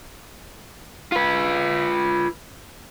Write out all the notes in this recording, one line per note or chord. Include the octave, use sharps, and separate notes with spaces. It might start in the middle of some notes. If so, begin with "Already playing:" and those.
F4 B4